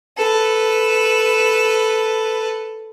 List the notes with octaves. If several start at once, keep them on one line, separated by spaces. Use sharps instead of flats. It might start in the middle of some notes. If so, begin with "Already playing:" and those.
A4 B4